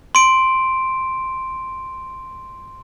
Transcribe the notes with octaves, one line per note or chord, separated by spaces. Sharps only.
C6 D7